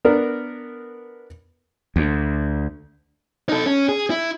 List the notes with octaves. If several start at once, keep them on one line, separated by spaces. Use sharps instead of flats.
B3 D4 A#4
D2
D#4 A4
C#4
G#4
E4